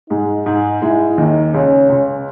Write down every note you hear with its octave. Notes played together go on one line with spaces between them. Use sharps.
G#2 G#3 D#4
G#2 G#3 D#4
G#2 G#3 E4
D#2 D#3 D#4
C#2 C#3 C#4
C#2 C#3